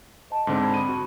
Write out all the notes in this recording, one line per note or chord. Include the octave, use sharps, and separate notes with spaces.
C5 D#5 A5
G#2 D3 C4
A5 B5 G#6
A4 B5 D#6 D#7
F#4